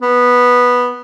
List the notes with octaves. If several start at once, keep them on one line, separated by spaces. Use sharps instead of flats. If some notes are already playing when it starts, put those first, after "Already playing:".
B3